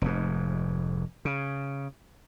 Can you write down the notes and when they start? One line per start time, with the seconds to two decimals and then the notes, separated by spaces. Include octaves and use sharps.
0.02 F1 G#2
1.25 C#3